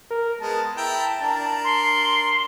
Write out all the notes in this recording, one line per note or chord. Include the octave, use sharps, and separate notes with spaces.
A#4
G#3 B3 A5
E4 G5 A#5
D4 A#4
C6